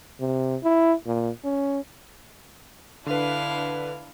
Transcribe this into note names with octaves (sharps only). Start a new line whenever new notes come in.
C3
E4
A#2
C#4
D3 D4 E4 B4 F5